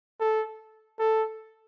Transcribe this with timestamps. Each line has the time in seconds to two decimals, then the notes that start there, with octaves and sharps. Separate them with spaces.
0.20 A4
0.99 A4